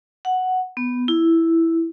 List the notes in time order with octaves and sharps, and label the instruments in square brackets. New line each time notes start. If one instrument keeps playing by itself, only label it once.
[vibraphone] F#5
B3
E4